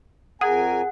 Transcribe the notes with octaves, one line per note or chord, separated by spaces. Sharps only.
F2 G#4 A#4 F#5 G#5